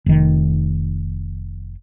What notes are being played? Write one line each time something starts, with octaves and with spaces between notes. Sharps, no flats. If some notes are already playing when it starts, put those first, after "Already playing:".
F1 D#3